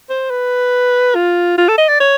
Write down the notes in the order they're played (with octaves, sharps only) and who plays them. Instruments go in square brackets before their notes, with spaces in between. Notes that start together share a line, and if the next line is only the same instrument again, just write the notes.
[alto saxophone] C5
B4
F4
F4
A4
D#5
D5
C#5